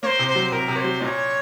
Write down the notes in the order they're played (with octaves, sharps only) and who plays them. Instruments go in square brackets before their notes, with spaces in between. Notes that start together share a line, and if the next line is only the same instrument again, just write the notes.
[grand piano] A#3 [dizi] C5 C#5
[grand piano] C3
[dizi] C5
[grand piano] F#3
[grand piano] C3 [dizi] A#4
[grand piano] C3
[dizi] C#5
[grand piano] F#3 [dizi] C5
[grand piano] A#2 [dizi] C#5 D#5